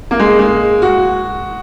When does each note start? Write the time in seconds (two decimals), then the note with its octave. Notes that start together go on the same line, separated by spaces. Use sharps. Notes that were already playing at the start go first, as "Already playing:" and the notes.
0.11 A#3
0.19 G#3
0.39 G#3
0.82 F#4